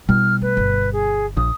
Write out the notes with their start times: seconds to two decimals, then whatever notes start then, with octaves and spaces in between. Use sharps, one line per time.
0.09 B2 G3 E4 F6
0.42 A3 B4
0.57 G1
0.92 G#4
1.37 A#1 D#6